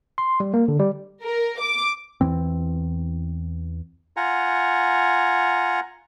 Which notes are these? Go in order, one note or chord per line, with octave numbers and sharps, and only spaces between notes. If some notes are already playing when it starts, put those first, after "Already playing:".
C6
G3
A#3
D3
G3
A#4
D6
E2 E3 C4
F4 F#5 G#5 A#5